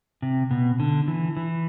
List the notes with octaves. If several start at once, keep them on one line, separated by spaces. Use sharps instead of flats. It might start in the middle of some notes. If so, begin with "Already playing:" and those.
C3
B2
D3
E3
E3